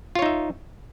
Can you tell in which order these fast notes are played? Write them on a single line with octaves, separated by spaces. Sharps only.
F4 C#5 D#4 E5